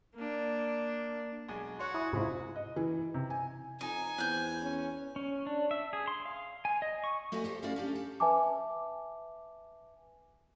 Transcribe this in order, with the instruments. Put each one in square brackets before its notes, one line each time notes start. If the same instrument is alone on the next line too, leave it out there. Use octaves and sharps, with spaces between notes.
[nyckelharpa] A#3 D4
[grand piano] B1 G#3 G#5
[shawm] F#4 [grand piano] C#5 F#5 C6
[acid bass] E4 [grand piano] G#5 D#6
[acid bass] G#2 [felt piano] C3 E4 F4
[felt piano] D#5
E3
C3
G#5
[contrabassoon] F2 [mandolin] D#4 [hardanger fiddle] G#5
[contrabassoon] E2 [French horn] C4 [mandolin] F#6 G6
[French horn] C#4
[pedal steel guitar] C#4
D4
E5
G#4
C6
F5
G#5
D#5
C#6
[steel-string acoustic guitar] A3 F#4 B4 D5 F#5 G#5
G4 A4 C5
A3 C#4 E4 F#4 D5 F5
C#4 D4 G4
A4
[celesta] B4 E5 G#5 A5 D6